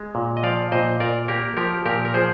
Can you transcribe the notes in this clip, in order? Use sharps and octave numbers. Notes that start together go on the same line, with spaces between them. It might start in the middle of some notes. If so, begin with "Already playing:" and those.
Already playing: G#3
A#2
D#5
F3 D5 F5
A#2 C5 D#5
A#2 A#4 D5
A#3 G4 A#4
F3 G4 A#4
A#2 G4 A#4
A#4
F3 G#4 C5